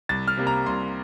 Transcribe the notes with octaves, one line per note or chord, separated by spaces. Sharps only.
C2 A6
F6
C3 G3 A#3
A#5
C2 C6